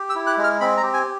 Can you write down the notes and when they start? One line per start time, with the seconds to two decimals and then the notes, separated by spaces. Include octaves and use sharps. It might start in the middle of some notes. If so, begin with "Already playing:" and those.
Already playing: G4
0.10 E6
0.15 E4
0.27 F#6
0.38 G#3
0.44 F6
0.60 C4 B5
0.77 A#5
0.83 G4
0.94 G#5